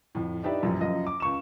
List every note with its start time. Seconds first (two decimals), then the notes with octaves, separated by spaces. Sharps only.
0.15 F2 A2
0.43 D4 D#4 G4 B4 D5 E5
0.63 A#1 F#2
0.80 F#1 F#2 F3 D#5
1.07 D6
1.20 C#2 C#6 E7